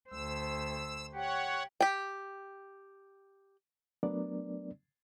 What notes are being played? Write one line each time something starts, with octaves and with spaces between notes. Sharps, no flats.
D2 C5 E6
G4 C#5 F#5
G4 G5
F#3 A3 B3 D4 A#4 D5